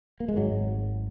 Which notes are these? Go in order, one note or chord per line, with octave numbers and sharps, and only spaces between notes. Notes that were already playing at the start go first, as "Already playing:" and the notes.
A#3
G#3
G#1 G#2 F#3